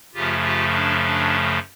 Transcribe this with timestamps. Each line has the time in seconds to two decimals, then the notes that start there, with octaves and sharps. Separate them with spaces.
0.14 F#2 C#3 F3 A3 F4 G4
0.44 F4 G4
0.74 D4
1.05 D4